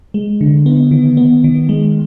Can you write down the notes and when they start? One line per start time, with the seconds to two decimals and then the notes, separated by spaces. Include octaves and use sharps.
0.14 G#3
0.41 D3
0.66 B3
0.91 D#3
1.17 B3
1.44 D#3
1.69 G#3